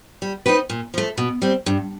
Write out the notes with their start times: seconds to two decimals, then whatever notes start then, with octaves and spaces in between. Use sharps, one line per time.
0.22 G3
0.46 C4 D#4 G4 B4
0.70 A#2
0.94 F3 A3
1.18 B2
1.42 G3 C4
1.66 G2